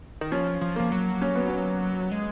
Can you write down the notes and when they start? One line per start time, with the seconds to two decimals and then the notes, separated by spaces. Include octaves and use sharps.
0.21 D#3
0.32 F3 C#4
0.61 F3
0.76 F3 A#3
0.92 F#3
1.22 C#4
1.35 B3
1.48 C#4
2.11 G#3